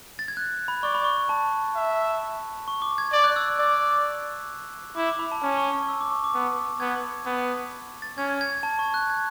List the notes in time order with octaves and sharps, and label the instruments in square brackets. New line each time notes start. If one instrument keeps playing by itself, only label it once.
[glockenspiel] A6
G#6
F#6
B5
[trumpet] D5 [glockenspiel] C#6
[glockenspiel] B5
C#6
A5
[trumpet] E5
[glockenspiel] C#6
D6
G#6
[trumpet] D5 [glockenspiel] G#6
[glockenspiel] F#6
E6
D6
[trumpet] D5 [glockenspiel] D6
[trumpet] E4 [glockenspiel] D6
[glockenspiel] D6
B5
A5
[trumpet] C#4 [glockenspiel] A5
[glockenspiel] C#6
C#6
E6
D6
C#6
D6
[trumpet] B3
[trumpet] B3 [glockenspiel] G#6
[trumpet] B3
[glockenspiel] A6
[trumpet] C#4 [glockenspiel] G#6
[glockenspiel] G#6
A5
C#6
F#6
G#6